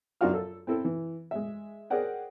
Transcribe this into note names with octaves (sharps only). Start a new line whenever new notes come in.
F#2 D4 F4 F#4 F5 F6
A4
C4 E4 A4
E3
G#3 E5
G#4 A#4 C5 D5 F#5 G5